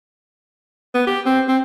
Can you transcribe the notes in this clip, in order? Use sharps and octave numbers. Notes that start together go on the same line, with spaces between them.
B3
G4
C4
C4